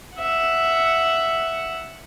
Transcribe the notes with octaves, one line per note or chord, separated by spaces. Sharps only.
E5 F#5